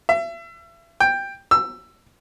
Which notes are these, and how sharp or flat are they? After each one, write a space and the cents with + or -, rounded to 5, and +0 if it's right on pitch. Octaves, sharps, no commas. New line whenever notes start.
E5 +35
G5 +10
E6 +20